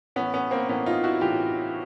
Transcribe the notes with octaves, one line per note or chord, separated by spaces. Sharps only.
A2 E3 B3 C#4
B3 C#4
A#3 C4
A2 E3 B3 C#4
D#4 F4
E4 F#4
A2 E3 F4 G4